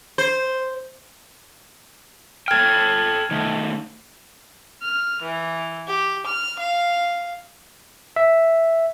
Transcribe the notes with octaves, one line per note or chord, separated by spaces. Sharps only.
C5
A4 G5 F6 G#6
D#3 A3
F6
E3
G4
F6
F5
E5